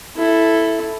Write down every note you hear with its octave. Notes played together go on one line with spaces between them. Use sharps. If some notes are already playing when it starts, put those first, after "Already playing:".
E4 A4